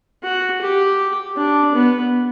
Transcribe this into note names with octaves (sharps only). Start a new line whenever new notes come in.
F#4
G4
D4
B3